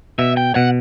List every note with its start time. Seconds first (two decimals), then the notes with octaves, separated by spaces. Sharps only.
0.19 B2 E5
0.37 G5
0.55 B2 F#5